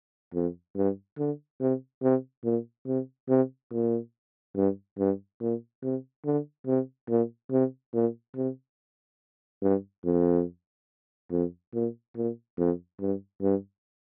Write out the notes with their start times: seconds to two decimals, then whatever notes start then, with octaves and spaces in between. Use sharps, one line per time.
0.34 F2
0.76 G2
1.18 D3
1.61 C3
2.02 C3
2.44 A#2
2.87 C3
3.29 C3
3.72 A#2
4.56 G2
4.98 G2
5.41 A#2
5.83 C3
6.25 D3
6.66 C3
7.09 A#2
7.51 C3
7.93 A#2
8.36 C3
9.62 G2
10.05 F2
11.31 F2
11.74 A#2
12.16 A#2
12.58 F2
13.00 G2
13.42 G2